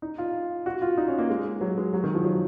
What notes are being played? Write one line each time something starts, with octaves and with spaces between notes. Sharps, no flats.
D#4
F4
F#4
F4
D#4
C#4
A#3
G#3
F#3
G#3
F#3
D#3
F3
F#3